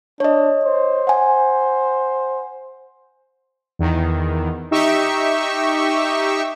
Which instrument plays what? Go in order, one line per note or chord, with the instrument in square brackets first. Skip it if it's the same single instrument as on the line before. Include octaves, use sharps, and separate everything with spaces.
[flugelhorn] D4 [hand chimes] C#5 D#5
[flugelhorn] C5
[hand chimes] F#5 G#5
[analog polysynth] E2 D#3
D#4 G4 E5 C#6